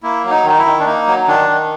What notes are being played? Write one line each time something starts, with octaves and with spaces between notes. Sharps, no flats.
A#3 E4
F#3
D#4
D#3
D#4
E4
D#3
D4
A#3 D#4
F#3
D#3 D4
D#3